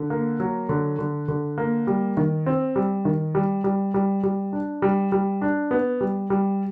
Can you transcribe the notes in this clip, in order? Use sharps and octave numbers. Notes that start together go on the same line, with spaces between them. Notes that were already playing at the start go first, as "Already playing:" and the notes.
Already playing: D3
A#3
F#3
D3
D3
D3
A#3
G3
D#3
C4
G3
D#3
G3
G3
G3
G3
D4
G3
G3
D4
B3
G3
G3